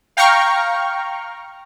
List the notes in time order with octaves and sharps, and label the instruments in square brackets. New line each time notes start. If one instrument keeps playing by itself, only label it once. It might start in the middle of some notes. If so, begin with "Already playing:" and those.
[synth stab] F5 G5 A#5 C#6 F6